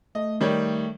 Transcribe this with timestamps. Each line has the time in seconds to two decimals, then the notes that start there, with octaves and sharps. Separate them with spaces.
0.15 A3 D#5
0.41 D#3 G3 C#5